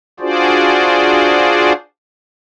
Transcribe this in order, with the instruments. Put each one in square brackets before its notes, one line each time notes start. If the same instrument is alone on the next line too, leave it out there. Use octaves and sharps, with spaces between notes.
[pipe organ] D4 F4 F#4 G#4 C5 D5